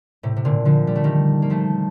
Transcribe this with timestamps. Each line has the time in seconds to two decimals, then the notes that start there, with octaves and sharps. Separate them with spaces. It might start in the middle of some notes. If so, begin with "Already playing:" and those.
0.23 A2 C3
0.36 C3
0.45 A#2 D3
0.65 D3 F3
0.87 G3
0.95 A3
1.04 D#3 G3
1.42 A#3
1.50 F3 A3